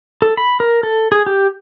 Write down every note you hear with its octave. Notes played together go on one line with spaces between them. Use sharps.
A4
B5
A#4
A4
G#4
G4